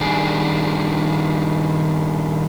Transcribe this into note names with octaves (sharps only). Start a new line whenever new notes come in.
D#3 G3 D4 G#4